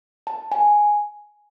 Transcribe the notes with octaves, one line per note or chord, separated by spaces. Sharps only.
A5
G#5